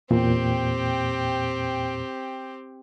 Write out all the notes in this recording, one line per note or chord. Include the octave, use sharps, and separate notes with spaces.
E2 A#2 C4 G4